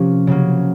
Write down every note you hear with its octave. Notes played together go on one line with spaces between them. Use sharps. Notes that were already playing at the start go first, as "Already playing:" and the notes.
Already playing: C3 F3 A#3 C#4
C#3 F#3 A#3